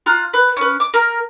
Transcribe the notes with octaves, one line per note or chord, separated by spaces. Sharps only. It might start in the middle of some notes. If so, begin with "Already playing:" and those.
F4 A#5 F#6
B4
C#4 B4
D6
A#4